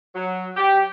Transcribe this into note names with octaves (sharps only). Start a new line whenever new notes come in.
F#3
G4